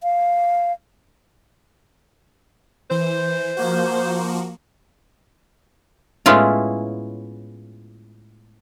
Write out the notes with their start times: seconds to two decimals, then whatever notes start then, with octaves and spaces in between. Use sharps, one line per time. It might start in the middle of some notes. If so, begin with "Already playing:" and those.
0.03 F5
2.91 E3 C5
3.57 F3 A#3 F#4
6.26 A2 G#3 B3 C#4 E4 F4